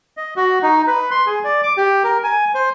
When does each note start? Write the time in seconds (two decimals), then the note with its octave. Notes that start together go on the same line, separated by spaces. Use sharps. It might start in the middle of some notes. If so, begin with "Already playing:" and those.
0.17 D#5
0.36 F#4
0.63 D#4
0.87 B4
1.11 C6
1.26 G#4
1.44 D5
1.63 D6
1.77 G4
2.04 A#4
2.24 G#5
2.54 C5